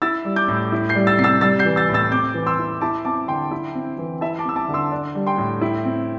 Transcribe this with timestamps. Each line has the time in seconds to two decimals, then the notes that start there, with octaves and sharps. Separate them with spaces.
0.02 E4 E6 A6
0.25 G3
0.36 D6 G6
0.48 A2
0.72 E4
0.89 G6 C7
0.95 G3
1.07 E6 A6
1.18 C3 C7
1.24 E6 A6
1.41 G3 E6 A6
1.59 G6 C7
1.65 E3
1.76 E6 A6
1.89 A2
1.94 E6 A6
2.12 C4 D6 G6
2.34 E3
2.46 C6 E6
2.59 E4
2.81 E4 A5 D6
3.05 C4 A5 D6
3.28 D3 G5 C6
3.51 E4
3.75 C4
3.98 E3
4.21 E4 E5 A5
4.39 A5 D6
4.45 C4 E6
4.56 A5 D6
4.68 D3
4.74 C6 E6
4.92 D4
5.15 G3
5.27 G5 C6
5.38 A2
5.61 E4
5.85 C4